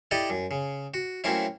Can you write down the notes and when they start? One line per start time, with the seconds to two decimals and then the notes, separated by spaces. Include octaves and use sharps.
0.11 E4 G4 A4 D5 D#5
0.30 F#2
0.51 C#3
0.94 F#4
1.24 F#3 A3 A#3 C4 C#4 E4